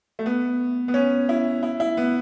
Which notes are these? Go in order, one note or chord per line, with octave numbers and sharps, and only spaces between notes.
A3
B3
B3
C#4
E4
E4
E4
B3